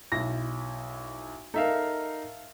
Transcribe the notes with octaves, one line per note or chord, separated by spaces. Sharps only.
B1 E4 A#6
D#4 A4 A#4 E5 F5